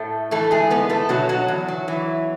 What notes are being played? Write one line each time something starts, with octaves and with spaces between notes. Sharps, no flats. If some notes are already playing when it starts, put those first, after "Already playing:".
Already playing: A2 A3 A4
E3 A3 A4
G#3 G#4
G#2 B3 B4
A3 A4
B2 F#3 F#4
F#3 F#4
E2
F#3
E3